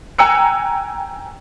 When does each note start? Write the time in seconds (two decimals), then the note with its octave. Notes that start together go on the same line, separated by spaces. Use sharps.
0.18 G5 G#5 A#5 E6 F#6 C#7